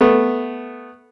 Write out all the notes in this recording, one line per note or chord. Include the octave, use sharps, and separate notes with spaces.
A3 B3